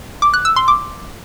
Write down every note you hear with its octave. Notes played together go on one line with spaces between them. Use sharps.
D6
F#6
E6
C6
D6